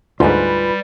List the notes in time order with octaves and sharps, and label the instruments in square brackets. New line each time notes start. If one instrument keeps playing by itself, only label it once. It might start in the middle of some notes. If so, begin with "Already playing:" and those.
[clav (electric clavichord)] D2 G#2 [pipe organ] G3 [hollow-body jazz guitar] F4 G#5 [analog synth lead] B4